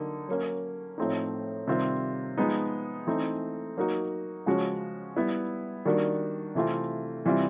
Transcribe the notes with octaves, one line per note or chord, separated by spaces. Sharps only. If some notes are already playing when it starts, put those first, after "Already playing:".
Already playing: D3 F#3 A#3 D#4
F#3 A#3 C#4
A2 F3 A3 C4 D#4
C3 D#3 G3 C4 F4
F3 G#3 B3 D#4
E3 A3 C4 D#4
F#3 A#3 D#4 F#4
C#3 F3 G#3 C#4 F#4
G3 B3 E4
D#3 G3 A#3 D4 F#4
C3 E3 A3 C4 F4
C3 E3 G3 C4 F4